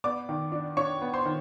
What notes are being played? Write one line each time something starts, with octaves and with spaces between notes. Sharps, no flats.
B3 D5 D6
D#3
D4
D4 C#5 C#6
B3
C5 C6
D#3